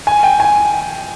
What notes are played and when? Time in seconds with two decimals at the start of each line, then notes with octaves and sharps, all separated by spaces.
0.07 G#5
0.23 G5
0.40 G#5